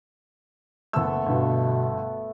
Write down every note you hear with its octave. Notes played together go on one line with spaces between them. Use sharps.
F#1 A3 B3 E6
G1 G2 B2